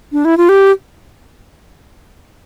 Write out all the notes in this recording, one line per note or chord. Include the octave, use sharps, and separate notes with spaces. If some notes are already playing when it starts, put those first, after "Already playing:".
D4
E4
F4
G4